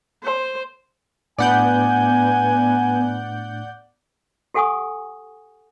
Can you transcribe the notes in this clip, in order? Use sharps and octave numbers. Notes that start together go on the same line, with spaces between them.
C5
A2 A3 B3 D4 D5 F#5 G#5 G6
G4 A4 F#5 G#5 C#6 D#6